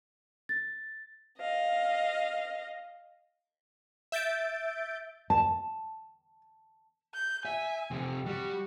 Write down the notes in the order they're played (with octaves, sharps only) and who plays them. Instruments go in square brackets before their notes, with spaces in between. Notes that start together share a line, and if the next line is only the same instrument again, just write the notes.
[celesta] A6
[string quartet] D#5 F5
[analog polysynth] E5 G6 A6 D7
[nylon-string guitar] A5
[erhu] G6
[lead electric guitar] E5 [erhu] G#5
[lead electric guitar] F2 C3
[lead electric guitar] G3 [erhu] F#4